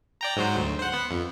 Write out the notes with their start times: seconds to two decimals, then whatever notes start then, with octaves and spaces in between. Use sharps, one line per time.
0.21 D5 G5 A#5
0.36 G#2 F#3 C5
0.57 D2
0.79 C5 F#5
0.93 B3 F#5
1.11 F2